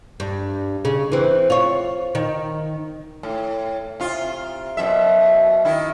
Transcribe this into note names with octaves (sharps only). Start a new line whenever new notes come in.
G2
C#3
E3 C4
F4 C#5
D#3
A2
C3 F4
F#2 B2 E5
D#3 E4